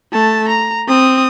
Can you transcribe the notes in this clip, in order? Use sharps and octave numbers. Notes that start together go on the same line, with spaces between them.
A3 A5
A#5
C4 D#6